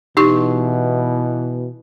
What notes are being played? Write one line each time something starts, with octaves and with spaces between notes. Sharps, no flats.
B2 E3 D#4 G4 C#6